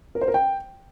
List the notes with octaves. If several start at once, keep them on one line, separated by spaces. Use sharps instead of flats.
A#4
C5
A#4
G5